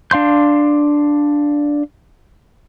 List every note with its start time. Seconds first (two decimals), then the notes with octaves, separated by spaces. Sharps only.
0.11 D4 F5 C6 G6